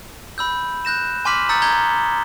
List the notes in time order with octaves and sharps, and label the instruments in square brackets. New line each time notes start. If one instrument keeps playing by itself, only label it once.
[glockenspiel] B5 E6 G6
F#6 G6 A#6 E7
G#5 C6 D6 F6 B6 F#7
A#5 D#6 E6 G6 A6 C#7
A#5 G6 G#6 G7